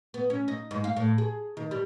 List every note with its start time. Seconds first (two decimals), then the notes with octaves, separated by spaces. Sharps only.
0.14 B3
0.30 C#4
0.48 D#4
0.71 G#2
0.84 F5
0.97 A2
1.18 G#4
1.57 D#3
1.71 G3